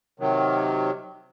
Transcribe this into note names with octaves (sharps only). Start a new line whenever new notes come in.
C3 D#3 F#3